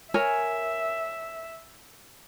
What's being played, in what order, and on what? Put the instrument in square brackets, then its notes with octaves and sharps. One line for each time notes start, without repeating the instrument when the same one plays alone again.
[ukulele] A#4 C#5 G#5 [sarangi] E5